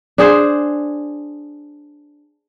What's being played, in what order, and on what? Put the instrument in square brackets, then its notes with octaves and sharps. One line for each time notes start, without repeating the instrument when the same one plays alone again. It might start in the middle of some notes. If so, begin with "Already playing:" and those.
[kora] D4 G#4 C5